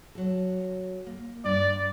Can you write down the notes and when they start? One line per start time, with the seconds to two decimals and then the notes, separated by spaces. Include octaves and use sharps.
0.15 F#3 A4
1.07 A#3
1.44 G2 D5